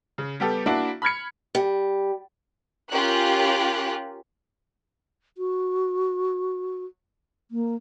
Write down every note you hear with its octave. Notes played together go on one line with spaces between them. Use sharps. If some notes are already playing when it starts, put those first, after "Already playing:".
C#3
G3 B3 G4 A4
A#3 D4 E4 F#4
B5 F6 G#6 C#7
G3
C#4 F4 G4 A#4 F#6
F#4
A#3